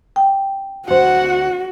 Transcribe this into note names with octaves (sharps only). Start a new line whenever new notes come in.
G5
D2 F#4 C5 F#5